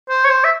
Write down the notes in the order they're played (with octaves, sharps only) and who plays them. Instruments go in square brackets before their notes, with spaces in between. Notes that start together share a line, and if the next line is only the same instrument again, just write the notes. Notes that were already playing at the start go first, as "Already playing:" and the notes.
[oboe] C5
C#5
C5
E5